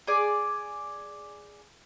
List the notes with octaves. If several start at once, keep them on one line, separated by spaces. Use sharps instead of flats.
G#4 D5